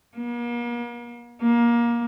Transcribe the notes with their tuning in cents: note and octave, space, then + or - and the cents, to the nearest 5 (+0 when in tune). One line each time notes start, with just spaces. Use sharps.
A#3 +45
A#3 +20